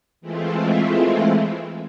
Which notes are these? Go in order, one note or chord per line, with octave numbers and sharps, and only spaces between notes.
E3 G#3 A3 C4 E4 F4